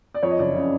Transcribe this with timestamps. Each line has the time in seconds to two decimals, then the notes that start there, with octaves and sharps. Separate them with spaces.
0.14 D5
0.23 F2 C#5
0.31 D#5
0.39 F#1 D5
0.55 C#3